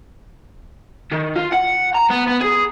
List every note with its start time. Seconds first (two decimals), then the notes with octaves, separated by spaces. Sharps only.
1.12 D#3
1.36 F4
1.53 F#5
1.95 A#5
2.10 B3
2.27 B3
2.41 G#4